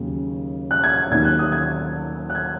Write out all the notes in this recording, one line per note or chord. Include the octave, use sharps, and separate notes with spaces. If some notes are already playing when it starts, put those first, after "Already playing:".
Already playing: D#2 C#3 F#3
F#6
G#6
D#2 D#3 F#3 G#6
F#6
D#6
G#6
F#6
G#6